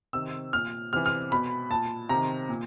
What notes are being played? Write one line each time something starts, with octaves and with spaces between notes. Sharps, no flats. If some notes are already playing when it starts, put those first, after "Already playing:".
C3 D#3 E6
A#2 F6
C3 E3 F6
F6
B2 B5
A#2 A5
C3 D#3 A#5
A#2